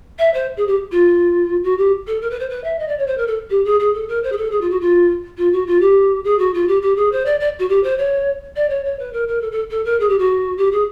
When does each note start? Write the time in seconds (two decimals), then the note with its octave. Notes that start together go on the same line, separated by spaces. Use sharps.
0.18 E5
0.33 C5
0.56 G#4
0.67 G4
0.91 F4
1.63 F#4
1.78 G4
2.07 A4
2.21 A#4
2.30 B4
2.39 C5
2.49 B4
2.63 E5
2.79 D#5
2.88 D5
2.98 C#5
3.06 C5
3.17 A#4
3.27 A4
3.50 G4
3.64 G#4
3.79 G#4
3.93 A4
4.08 A#4
4.23 C5
4.32 G#4
4.37 A4
4.51 G#4
4.61 F4
4.70 F#4
4.80 F4
5.37 F4
5.52 F#4
5.66 F4
5.80 G4
6.24 G#4
6.38 F#4
6.54 F4
6.68 G4
6.82 G4
6.96 G#4
7.11 C5
7.25 D5
7.40 D5
7.59 F#4
7.69 G4
7.83 C5
7.97 C#5
8.56 D5
8.69 C#5
8.84 C#5
8.99 B4
9.13 A#4
9.28 A#4
9.41 A4
9.51 A4
9.70 A4
9.85 A#4
9.99 G#4
10.09 G4
10.18 F#4
10.57 G4
10.72 G#4